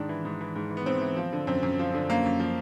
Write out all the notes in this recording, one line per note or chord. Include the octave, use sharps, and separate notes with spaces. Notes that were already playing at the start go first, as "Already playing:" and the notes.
Already playing: G#2 D#3 D4
E3
G#2
E3
G#2
E3
B3
G#2 C4
E3
F3
D3
F#2 C4
F#2
F3
D3
F#2 A#3
F#2
F3